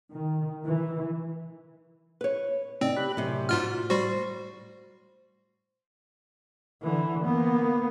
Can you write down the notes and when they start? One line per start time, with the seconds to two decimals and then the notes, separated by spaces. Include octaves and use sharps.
0.12 D#3
0.63 E3
2.21 B4 C#5
2.81 A2 C#3 C4 D#4 D5
2.97 G4 B5 F#6
3.17 F#2 A2 C3
3.49 G#2 F4 F#4 F6
3.90 G3 F#4 C5
6.82 D3 E3
7.25 A#3 B3